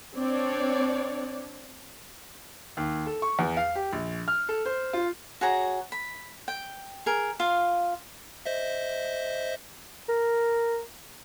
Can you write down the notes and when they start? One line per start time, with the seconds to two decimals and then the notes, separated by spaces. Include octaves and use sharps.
0.16 C4 D4 C#5 D5
2.77 D#2
3.06 A4
3.22 C#6
3.39 E2
3.57 F5
3.75 G4
3.93 A#1
4.28 F6
4.49 A4
4.65 C5
4.93 F4
5.41 F#4 G#4 C#5 A#5
5.92 B5
6.48 G5
7.06 G#4 A#4
7.39 F4 F5
8.46 C5 D#5 E5
10.09 A#4